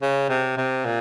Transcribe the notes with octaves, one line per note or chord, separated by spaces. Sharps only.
C#3
C3
C3
A#2